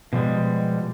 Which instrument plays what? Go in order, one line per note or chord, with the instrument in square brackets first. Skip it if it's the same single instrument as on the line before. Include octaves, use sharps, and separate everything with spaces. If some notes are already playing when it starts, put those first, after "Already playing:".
[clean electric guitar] B2 F3 G3 G#3